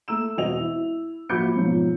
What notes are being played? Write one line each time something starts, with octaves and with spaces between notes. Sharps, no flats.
A3 A#5 E6 E7
E1 C4 F#4 D#5 F7
E4
A#1 F#4 B5 D6 G6 C#7
G#2 B2 F3 F#3